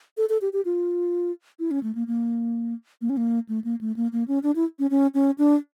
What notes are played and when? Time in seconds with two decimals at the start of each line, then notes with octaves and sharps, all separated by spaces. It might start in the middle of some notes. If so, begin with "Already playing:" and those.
0.17 A4
0.29 A4
0.42 G4
0.53 G4
0.65 F4
1.59 E4
1.71 C#4
1.83 A3
1.95 A#3
2.07 A#3
3.01 A#3
3.10 C#4
3.17 A#3
3.49 A3
3.64 A#3
3.81 A3
3.96 A#3
4.13 A#3
4.28 C#4
4.43 D4
4.56 E4
4.79 C#4
4.91 C#4
5.14 C#4
5.38 D4